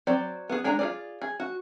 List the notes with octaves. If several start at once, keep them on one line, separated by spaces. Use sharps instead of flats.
F#3 C4 C5 D5
B3 G#4
G#3 D4 G#4 G#5 A#5
F4 G#4 D5
G#4
F#4